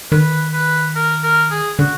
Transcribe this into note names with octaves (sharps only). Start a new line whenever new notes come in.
D#3 B4
B4
A#4
A#4
G#4
D3 F#4